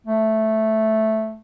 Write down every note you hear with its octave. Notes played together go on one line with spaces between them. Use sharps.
A3